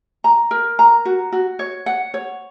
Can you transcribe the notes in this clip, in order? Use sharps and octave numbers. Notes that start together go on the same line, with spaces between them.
A#5
A#4
A#5
F#4
F#4
C#5
F#5
C#5